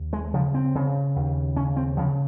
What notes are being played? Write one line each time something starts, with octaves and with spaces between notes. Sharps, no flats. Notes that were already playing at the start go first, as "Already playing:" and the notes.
Already playing: D#2
G#3
C#3 F3
C4
C#3
D#2
C#3 C#4
C4
C#3 F3